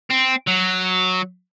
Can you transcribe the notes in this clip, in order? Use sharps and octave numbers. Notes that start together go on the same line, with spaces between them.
C4
F#3